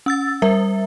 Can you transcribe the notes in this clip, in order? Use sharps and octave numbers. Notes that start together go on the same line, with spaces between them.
C#4 E6 A6
G3 A#4 E5